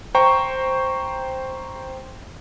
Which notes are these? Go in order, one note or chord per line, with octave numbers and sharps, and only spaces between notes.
C5 G5 A#5 C#6